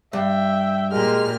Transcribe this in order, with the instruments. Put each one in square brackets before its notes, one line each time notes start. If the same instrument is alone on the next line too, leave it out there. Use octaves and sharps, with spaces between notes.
[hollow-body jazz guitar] G2 [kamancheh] E5 G5
[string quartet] A#2 F6 [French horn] G#3 [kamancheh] G4 A#4